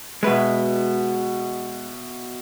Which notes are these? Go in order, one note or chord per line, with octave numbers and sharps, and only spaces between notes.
B2 G#3 B4 E5